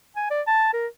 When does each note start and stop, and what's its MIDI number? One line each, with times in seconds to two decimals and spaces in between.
0.16 0.30 80
0.30 0.41 74
0.47 0.69 81
0.73 0.87 70